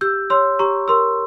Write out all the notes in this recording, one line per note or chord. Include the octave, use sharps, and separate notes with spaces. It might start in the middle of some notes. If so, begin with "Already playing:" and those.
G4 E6 G6
C#5 C6 E6
G4 A#5 C#6
A#4 C6 E6